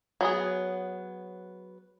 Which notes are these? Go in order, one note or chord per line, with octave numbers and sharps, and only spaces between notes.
F#3 B3 G#4